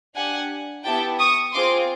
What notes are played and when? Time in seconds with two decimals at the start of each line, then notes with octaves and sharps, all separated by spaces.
0.15 D4 G4 F#5 G#5
0.84 B3 E4 G4 G5 A5
1.19 C#6 D#6
1.53 C4 F4 G#4 C6 D6